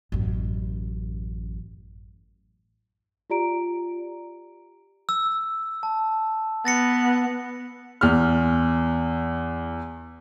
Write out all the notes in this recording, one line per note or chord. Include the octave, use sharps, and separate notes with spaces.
A1 F#2
F4 G4 D5 A#5 D7
E6
A5
B3 A6 A#6 C#7
E2 F6